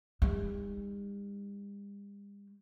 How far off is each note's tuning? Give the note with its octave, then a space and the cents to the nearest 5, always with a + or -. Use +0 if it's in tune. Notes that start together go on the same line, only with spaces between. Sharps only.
G3 +45 D#4 +0